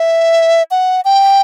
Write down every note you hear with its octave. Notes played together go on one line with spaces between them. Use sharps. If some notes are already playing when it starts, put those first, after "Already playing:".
Already playing: E5
F#5
G5